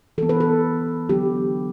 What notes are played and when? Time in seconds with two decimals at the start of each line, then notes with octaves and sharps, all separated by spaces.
0.18 E3 B3 A4
0.29 B4
0.40 A4
1.09 D3 F#3 B3 G4